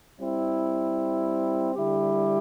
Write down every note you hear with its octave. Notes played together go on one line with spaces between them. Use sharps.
G3 C4 E4
D3 G3 E4 G4